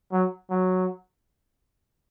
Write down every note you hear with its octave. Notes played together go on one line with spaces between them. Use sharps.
F#3
F#3